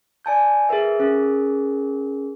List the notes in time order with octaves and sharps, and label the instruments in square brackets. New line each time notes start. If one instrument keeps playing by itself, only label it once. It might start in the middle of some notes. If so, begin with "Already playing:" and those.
[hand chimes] D5 G#5 A5 G6
G#4 A#4 B4 E5
C#4 G#4 A#4